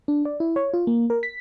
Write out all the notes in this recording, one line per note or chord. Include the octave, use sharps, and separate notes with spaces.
D4
D5
E4
C#5
F4
A#3
A#4
B6